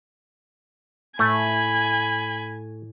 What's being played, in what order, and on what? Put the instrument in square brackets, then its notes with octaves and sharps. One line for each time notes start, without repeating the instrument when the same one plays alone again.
[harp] A2 [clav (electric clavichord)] A3 [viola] G#5 [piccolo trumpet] B5